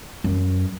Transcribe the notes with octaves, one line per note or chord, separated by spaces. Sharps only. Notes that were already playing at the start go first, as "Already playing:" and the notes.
F#2